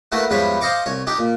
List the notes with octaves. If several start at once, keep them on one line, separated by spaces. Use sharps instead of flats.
A3 A#3 E4 F#4 B4
E2 G#2 F3 G3 B4 C#5
C5 D#5 F5 A#5 C#6 D6
C2 C#5
D4 D#4 G4
A#2